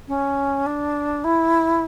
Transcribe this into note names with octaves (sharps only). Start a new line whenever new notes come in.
C#4
D4
E4